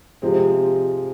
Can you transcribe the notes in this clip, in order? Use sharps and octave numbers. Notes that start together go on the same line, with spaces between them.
C3 F3 G#3 C4